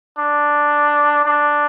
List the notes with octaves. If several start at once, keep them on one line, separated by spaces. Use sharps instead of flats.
D4
D4